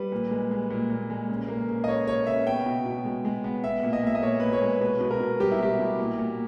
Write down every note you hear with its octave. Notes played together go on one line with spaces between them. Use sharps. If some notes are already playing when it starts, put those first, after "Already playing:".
Already playing: G3 B4
A#2
G#3
G#3
A#2
A#2
G#3
C#3
A#3
C#3
D#5
C#3 C#5
C#3 C#5
C#3 E5
B3 G5
B2
B2
G#3
G#3
B3
B3 E5
A#2
D#5
A#2 E5
D#5
A#2 C#5
A#2 B4
C#5
G#3
B2 B4
B2
A#4
B2
G3 G4
E4
B2 G4
B2
A#2
A#2